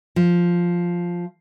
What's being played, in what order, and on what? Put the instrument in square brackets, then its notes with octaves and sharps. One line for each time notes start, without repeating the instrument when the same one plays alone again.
[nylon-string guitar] F3